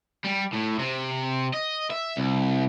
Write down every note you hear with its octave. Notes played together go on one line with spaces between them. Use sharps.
G3
A2
C3
D#5
E5
C2